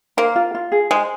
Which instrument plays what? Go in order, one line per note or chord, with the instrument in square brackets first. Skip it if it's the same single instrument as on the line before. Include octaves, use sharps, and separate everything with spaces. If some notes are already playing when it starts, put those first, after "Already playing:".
[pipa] A#3 [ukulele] C5
[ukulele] F4
F4
G#4
[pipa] G#3 [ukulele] C5